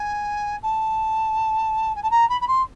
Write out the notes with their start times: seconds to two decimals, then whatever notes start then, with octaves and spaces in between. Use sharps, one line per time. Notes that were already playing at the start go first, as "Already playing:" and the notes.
Already playing: G#5
0.63 A5
1.95 G#5
2.03 A5
2.11 A#5
2.29 B5
2.41 B5
2.48 C6